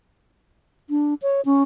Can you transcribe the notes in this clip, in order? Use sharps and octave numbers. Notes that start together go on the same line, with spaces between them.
D4
C#5
C#4